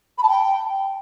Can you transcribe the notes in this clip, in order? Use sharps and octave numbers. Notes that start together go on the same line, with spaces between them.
B5
A5
G5